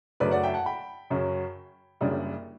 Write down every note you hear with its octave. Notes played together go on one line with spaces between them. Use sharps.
F#2 C#3 F#3 A3 D4 B4 D5
D5 F#5
E5 G5
F#5 A5
G5 B5
F#2 C#3 F#3 C#4
F#1 F#2 C#3 G3 D4